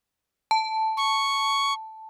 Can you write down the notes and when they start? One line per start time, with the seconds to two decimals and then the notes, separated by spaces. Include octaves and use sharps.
0.51 A5
0.97 C#6